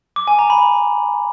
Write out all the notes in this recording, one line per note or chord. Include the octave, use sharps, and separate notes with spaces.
D6
G#5
A#5
B5